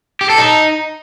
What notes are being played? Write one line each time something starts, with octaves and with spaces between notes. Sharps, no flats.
G4
A4
D#4